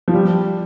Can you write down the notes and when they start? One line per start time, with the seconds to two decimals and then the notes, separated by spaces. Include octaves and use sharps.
0.08 F3
0.14 G3